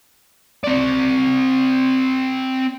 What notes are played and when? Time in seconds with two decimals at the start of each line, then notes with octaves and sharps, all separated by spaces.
0.64 C4 D5